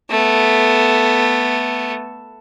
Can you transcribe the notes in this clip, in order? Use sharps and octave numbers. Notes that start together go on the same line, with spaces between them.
A3 B3